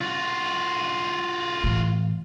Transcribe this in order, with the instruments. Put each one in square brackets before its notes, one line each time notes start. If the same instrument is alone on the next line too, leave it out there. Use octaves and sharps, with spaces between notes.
[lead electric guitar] F4 F#4
[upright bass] A2 E3